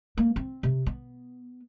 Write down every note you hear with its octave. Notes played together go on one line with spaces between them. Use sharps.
A#3
C4
C3
B3